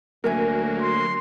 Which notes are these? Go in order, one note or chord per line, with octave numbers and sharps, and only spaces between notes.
D2 F#3 A#3 A#4 E5 G#5
C6